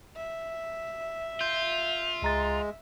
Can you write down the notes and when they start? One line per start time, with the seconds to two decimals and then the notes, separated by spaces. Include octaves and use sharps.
0.16 E5
1.41 F4 G6
2.22 C#2 G#3 A#5 A6